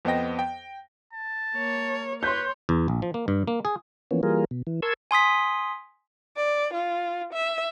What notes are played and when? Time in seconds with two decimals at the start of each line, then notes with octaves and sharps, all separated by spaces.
0.05 F2 B3 C5 D#5 G5 A#6
0.39 G5
1.13 A5
1.55 A#3 C#5
2.23 B4 C#5 C6 G6
2.69 E2
2.88 A#1
3.02 F3
3.14 A#3
3.28 G2
3.48 A#3
3.65 G#4
4.11 E3 F3 A#3 B3 C#4
4.23 E3 G3 A#3 F4 G#4 A#4
4.51 B2
4.67 E3
4.82 A#4 A5 C6 C#6 E6 G#6
5.11 G#5 C6 D#6 B6
6.37 D5
6.74 F4
7.33 E5